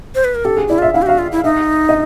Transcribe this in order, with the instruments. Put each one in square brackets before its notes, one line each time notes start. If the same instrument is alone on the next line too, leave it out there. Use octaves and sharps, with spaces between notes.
[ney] C5
B4
A#4
[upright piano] G4 [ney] A4
[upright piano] G#4
[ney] E4 [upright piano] D5
[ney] F4 [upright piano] E5
[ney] E4 [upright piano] F5
[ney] G4
[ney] F#4 [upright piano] F5
[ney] F4
E4
[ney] D#4 [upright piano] E5
[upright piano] D#5